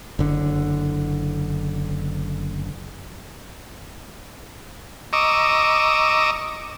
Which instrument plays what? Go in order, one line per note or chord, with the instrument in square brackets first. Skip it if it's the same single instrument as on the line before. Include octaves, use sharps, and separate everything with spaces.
[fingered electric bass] F#1 D3
[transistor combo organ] D#5 A#5 C#6 D6 E6